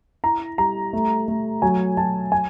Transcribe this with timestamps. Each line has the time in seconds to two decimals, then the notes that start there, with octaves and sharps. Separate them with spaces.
0.24 E4 A#5
0.58 G3 A#5
0.93 A3
1.28 A3
1.62 F#3 G#5
1.97 F#3 A5
2.32 G#5